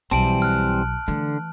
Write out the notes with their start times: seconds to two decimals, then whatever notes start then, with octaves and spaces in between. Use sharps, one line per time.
0.11 B1 E3 G3 C4 A5 D7 F#7
0.42 F6 F#6
1.08 D3 E3 A3